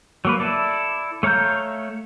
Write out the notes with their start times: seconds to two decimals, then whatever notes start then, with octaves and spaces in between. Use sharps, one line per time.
0.25 F#3 A#3 B4
0.40 E4 A4 D5
1.23 A3 C#5 F5 A#5 G6